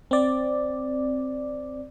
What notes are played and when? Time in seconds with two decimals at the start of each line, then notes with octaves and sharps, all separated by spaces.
0.11 C4 D5